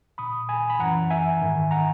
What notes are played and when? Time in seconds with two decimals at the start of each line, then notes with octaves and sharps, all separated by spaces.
0.18 A#2 B5 D#6
0.49 G#5 B5
0.70 B5
0.79 F#2 E3 F#5 A#5
1.10 E5 G#5
1.40 G#2 D#3
1.71 F#5 A#5